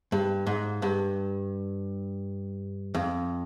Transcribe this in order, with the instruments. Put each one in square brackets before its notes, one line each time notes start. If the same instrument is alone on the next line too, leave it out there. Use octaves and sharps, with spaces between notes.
[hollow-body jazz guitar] G2
G#2
G2
F2